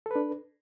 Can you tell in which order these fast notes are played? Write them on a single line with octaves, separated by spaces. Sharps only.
A4 B4 D4